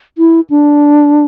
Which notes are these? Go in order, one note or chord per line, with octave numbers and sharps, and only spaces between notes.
E4
D4